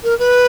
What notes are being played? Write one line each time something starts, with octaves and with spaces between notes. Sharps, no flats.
A#4
B4